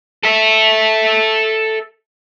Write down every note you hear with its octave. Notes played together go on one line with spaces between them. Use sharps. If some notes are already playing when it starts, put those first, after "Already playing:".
A4 E5